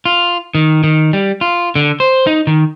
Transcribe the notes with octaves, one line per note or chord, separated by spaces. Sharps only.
F4
D#3
D#3
G3
F4
D3
C5
D#4
D#3